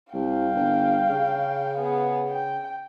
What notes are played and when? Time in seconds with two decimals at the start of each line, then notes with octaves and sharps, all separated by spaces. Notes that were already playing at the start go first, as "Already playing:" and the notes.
0.14 C2 F5 G5
0.54 G1
1.09 C#3
1.78 B3 G#4
2.29 G5